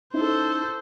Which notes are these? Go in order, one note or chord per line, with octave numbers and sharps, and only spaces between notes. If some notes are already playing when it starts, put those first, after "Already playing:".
C#4 D#4 E4 A4 C5